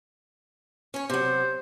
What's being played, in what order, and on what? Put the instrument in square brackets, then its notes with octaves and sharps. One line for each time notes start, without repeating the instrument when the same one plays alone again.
[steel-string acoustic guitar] C#4 C#5
[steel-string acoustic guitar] C3 F#3 [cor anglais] C5